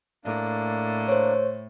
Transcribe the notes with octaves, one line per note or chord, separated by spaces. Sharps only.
A2 A#3 D4
C5 C#5